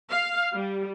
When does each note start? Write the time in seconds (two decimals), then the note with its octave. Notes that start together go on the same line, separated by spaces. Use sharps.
0.10 F5
0.53 G3